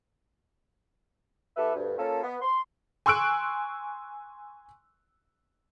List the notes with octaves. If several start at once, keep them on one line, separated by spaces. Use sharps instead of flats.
E3 B3 G4 A4 B4 E5
D2 G2
A#3 C#4 F4 A4
B3
C6
G#5 C6 C#6 E6 F#6 D7